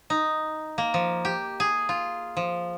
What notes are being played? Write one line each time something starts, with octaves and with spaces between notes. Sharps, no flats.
D#4
A#3
F3
G4
G#4
F4
F3